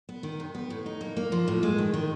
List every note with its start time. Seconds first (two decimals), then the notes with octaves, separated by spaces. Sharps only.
0.09 B3
0.23 D#3
0.40 C3
0.55 B3
0.70 A2
0.86 D#4
1.01 A#3
1.17 A#3
1.32 F3
1.48 A2
1.63 G#3
1.78 D#3
1.94 D#3